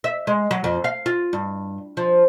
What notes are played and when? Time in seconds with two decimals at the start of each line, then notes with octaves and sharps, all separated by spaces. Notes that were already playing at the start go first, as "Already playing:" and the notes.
0.04 E5
0.27 G#3
0.51 F#3
0.64 F2
0.84 F5
1.06 F4
1.33 G2
1.97 F3